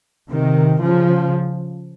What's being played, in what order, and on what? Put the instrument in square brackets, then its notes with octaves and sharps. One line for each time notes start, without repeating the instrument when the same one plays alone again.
[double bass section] C3 D#3
C#3 F3